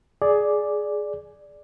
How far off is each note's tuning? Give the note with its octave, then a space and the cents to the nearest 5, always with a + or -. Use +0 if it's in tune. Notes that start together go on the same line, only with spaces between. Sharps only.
G#4 +10 D5 +0